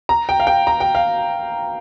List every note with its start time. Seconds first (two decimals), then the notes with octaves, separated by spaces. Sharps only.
0.09 A#5
0.29 G5
0.40 F5
0.47 G5
0.67 A#5
0.80 G5
0.95 F5